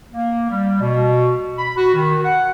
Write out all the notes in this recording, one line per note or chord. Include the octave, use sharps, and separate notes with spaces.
A#3
G3
B2
B5
F#4
D#3
F#5